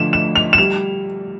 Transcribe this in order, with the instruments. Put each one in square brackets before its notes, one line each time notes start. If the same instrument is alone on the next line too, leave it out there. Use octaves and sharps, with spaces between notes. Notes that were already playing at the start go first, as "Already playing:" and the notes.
Already playing: [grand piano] D3 F3 A3 E7
E7
F7
E7
G3 F7